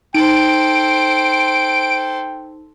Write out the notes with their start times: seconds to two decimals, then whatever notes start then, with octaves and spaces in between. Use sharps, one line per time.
0.14 D#4 A4 C5 G5 D7